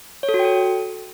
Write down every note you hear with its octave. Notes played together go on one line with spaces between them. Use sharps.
C#5
A4
F#4
G5
A4